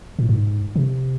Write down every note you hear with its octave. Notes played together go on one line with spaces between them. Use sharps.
A2
G#2
C3